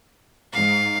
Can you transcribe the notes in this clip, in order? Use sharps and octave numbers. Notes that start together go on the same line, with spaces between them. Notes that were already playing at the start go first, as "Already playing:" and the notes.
G#2 F5